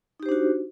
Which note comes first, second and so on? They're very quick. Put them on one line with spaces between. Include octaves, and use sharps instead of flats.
D#4 G4 C5 D4 F#4